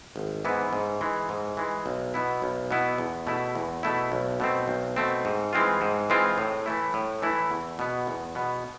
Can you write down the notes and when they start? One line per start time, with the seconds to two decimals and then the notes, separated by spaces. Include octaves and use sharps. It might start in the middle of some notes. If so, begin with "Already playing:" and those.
0.16 G#1
0.45 G#2 E3 B3 E4
0.73 G#2
1.01 E3 G#3
1.29 G#2
1.57 E3 G#3
1.86 B1
2.14 B2 B3 E4
2.42 B1
2.71 B2 B3 E4
2.98 E2
3.27 B2 A3 E4
3.55 E2
3.83 B2 A3 E4
4.12 B1
4.40 B2 A3 C4
4.68 B1
4.96 B2 A3 C4
5.25 G#2
5.53 E3 G#3 C4 F4
5.81 G#2
6.10 E3 G#3 C4 F4
6.38 A2
6.66 E3 A3 E4
6.94 A2
7.22 E3 A3 E4
7.50 E2
7.79 B2 B3
8.07 E2
8.35 B2 B3